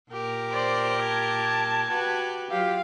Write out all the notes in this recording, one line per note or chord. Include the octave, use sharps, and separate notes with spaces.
A#2 G4 A#4
C5 D5
A5 G#6
F#4 G4 B4
F#3 F4 G4 F5